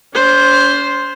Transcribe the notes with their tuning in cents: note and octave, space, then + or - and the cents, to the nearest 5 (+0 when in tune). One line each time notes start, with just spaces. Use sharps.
C#4 +45 C5 +0